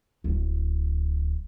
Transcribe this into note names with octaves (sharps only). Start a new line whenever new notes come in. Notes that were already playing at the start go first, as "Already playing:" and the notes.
D1